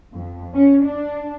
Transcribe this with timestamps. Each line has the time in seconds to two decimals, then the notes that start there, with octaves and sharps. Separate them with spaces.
0.13 F2
0.54 C#4
0.83 D4